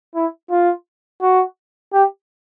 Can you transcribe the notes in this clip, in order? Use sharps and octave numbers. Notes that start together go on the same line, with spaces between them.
E4
F4
F#4
G4